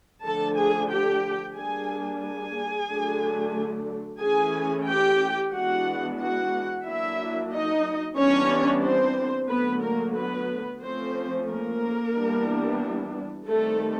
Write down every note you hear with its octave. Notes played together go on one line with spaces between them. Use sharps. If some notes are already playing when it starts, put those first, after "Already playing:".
D3 F3 A3 D4 A4 A5
G#4 G#5
G4 G5
G3 A#3 D4 G#4 G#5
G#4 G#5
D3 F#3 A3 D4
E3 A3 C#4 G#4 G#5
G4 G5
E3 G#3 B3 D4 F#4 F#5
F#4 F#5
F#3 A#3 D4 E4 E5
D#4 D#5
E3 G3 B3 C#4 D4 C#5
C4 C5
D3 F#3 A3 B3 B4
A#3 A#4
B3 B4
F3 A3 C4 C#4 C5
A#3 A#4
E3 G3 B3 D4
D#3 G3 A3 C4 A4